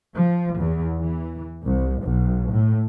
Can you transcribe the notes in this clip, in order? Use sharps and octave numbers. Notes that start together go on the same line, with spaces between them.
F3
E2
E3
C2
B1
A2